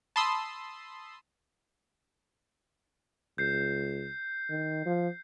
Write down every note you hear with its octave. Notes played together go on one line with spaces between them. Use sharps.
A5 B5 C6 D#6 E6
C#2 G6 C7
D#3
F3